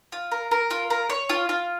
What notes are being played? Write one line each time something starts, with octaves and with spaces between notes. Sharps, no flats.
F4
A#4
A#4
F4
A#4
C#5
F4
F4